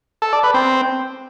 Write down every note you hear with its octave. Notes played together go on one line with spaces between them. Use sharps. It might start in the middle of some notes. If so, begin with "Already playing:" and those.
A4
D5
B4
C4